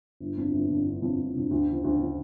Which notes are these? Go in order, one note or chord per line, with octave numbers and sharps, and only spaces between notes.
G1
F2 D3
G1
F2 D3
G1
F2 D3
G1
F2 D3
D2
C#3 F3
D2
C#3 F3